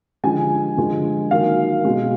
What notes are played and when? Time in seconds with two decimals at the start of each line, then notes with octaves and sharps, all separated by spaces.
0.24 D3 F3 G#3 G#5
0.77 D3 F3 G#3
1.31 D#3 F#3 A#3 F5
1.85 B2 G#3